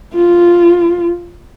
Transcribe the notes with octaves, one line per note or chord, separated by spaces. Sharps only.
F4